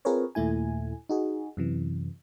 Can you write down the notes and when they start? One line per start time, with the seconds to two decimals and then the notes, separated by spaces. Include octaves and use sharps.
0.05 C4 F4 G#4 A#4 B4 C#5
0.35 D#2 A#2 A3 E4 G#5
1.09 D#4 F#4 G#4
1.57 F#2 C3 E3